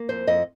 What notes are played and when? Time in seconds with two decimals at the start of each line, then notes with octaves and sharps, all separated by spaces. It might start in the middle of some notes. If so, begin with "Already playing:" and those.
Already playing: A#3
0.09 F2 C5
0.27 F2 D#5